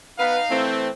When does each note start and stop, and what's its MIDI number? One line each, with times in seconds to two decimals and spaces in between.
0.19 0.39 59
0.19 0.65 63
0.19 0.39 71
0.19 0.65 77
0.51 0.89 52
0.51 0.89 57
0.51 0.89 60